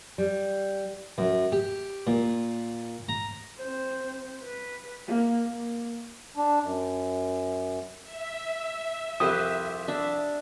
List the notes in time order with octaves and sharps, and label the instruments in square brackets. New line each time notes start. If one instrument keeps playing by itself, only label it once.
[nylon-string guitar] G3
[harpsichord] F#2
G4
A#2
A#5
[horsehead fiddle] C4 C5
B4
A#3
A#3
[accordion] D4
F#2
[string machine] E5
[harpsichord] C2 F2 C4 [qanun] G4 B4 C5 [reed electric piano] D#6
[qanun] D4 E5